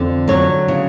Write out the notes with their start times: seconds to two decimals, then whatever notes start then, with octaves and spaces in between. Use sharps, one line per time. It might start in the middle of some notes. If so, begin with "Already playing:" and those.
Already playing: F2 D3
0.28 F#3 C#5
0.68 C#3